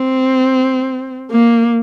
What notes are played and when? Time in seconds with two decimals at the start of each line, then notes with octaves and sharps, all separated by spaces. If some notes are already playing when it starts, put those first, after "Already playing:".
Already playing: C4
1.31 A#3